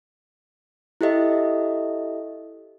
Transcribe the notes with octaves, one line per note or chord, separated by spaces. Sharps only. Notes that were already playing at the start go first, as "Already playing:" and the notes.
E4 G4 A4 D#5 E5